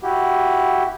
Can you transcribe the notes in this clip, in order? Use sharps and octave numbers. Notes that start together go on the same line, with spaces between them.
E4 F#4 G4